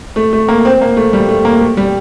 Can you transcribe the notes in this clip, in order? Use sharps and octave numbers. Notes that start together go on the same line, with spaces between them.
A3
A3
A#3
C4
A#3
A3
G3
A3
A#3
A3
G3